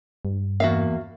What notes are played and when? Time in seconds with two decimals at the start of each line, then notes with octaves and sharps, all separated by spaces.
0.25 G2
0.60 E2 A#3 F#4 E5 F5